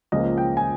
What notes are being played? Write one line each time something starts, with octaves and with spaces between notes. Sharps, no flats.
C#2 C#3 F3 A#3 D#5
G5
G#5